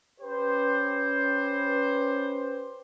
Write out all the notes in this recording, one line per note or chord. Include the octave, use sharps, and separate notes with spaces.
C#4 G4 B4 C5